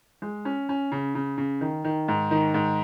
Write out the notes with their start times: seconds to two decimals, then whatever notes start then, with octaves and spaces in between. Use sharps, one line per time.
0.22 G#3
0.45 C#4
0.69 C#4
0.92 C#3
1.15 C#3
1.38 C#3
1.61 D#3
1.84 D#3
2.08 G#2
2.31 D#3
2.54 G#2